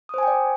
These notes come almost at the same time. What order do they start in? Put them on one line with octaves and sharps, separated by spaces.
D#6 C5 G#5 G5 D5